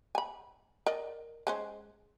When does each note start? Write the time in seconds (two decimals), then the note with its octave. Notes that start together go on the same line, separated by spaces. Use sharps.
0.15 G#5 B5
0.86 A#4 D5 D#5
1.47 G#3 C#4 C5